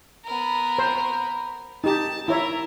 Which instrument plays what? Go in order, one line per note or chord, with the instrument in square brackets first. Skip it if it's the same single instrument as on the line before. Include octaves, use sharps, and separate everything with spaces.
[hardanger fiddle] B3 A#4
[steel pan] C5
[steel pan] D#4 G4 [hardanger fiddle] A5
[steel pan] E4 C#5 E5 [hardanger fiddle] A#4